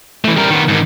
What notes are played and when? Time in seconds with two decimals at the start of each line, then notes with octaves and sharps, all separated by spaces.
0.25 E3 A3
0.37 G3 A#4
0.51 D#3 B3
0.69 G#2 D#3